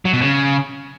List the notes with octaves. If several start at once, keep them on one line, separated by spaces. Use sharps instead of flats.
F#3
B2
C#3